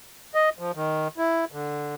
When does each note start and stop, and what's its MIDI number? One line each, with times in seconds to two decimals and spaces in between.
0.35 0.50 75
0.59 0.72 53
0.75 1.08 51
1.18 1.45 64
1.52 1.95 50